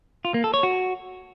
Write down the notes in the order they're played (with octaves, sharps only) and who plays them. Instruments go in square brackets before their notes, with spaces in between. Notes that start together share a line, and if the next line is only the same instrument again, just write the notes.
[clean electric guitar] F4
A#3
A4
C#5
F#4